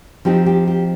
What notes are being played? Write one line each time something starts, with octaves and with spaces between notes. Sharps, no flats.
F3 C4 D#4 G4
G4
G4